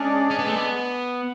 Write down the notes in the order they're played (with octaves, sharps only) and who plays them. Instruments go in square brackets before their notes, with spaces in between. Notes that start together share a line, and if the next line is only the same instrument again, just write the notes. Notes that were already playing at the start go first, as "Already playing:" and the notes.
Already playing: [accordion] G#3 D4 G#4 D5 [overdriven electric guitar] C#4
[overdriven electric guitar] C#4
B3
A3
B3